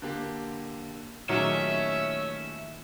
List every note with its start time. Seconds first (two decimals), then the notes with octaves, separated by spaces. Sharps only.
0.02 D3 A#3 G4
1.29 A#2 D#3 F#3 A3 C#4 F#4 G#4 E5